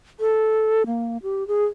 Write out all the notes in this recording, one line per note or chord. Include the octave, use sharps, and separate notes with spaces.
A4
A#3
G4
G#4